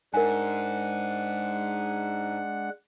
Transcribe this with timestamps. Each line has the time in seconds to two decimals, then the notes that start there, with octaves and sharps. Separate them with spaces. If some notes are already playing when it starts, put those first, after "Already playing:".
0.14 G#2 G#3 D4 A#4 F#5 G#5